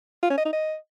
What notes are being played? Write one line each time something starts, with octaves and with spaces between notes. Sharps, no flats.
F4
C#4
D#5
D#4
D#5